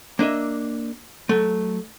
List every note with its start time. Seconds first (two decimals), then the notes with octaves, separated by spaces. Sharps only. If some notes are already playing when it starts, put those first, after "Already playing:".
0.19 A#3 D4 D#5 E5
1.29 F#3 A3